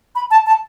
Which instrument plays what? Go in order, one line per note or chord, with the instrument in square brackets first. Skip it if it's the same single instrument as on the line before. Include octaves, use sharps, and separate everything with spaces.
[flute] B5
A5
A5